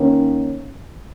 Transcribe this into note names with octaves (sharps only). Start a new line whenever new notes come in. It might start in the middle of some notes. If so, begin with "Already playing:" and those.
Already playing: D#3 A#3 C#4